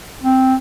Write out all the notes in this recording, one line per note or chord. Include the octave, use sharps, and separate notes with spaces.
C4